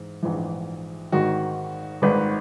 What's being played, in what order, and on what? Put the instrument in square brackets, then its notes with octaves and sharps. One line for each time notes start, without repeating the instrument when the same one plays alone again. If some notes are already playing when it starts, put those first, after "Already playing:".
Already playing: [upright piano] G#2 E3
A#1 G#2 E3
G#1 G#2 D#3 F#4
G#1 G#2 D#3 B4